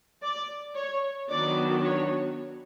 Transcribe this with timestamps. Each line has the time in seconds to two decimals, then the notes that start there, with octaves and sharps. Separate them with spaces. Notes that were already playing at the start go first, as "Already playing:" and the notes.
0.22 D5
0.75 C#5
1.28 D#3 F#3 B3 D4 D5
1.82 C#5